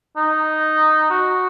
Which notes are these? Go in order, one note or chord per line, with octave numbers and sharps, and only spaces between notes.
D#4
F#4